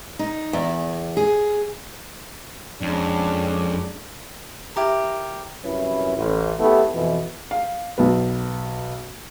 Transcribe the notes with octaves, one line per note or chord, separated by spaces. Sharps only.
D#4
E2
G#4
F2 G#3 C#4 D4
E4 G4 A#4
C2 F#2 C#4 E4 B4
A1
A3 B3 E4 G4 A4
F2 B2 E3
F5
B1 B3